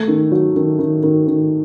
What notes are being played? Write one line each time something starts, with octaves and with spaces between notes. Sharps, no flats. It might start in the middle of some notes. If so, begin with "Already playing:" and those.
Already playing: A3
D#3
F#3
D#3
D#3
D#3
D#3